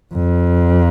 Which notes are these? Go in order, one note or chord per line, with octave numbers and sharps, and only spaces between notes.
F2